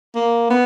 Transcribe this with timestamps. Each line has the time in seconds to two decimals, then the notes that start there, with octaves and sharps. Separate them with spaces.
0.15 A#3
0.50 B3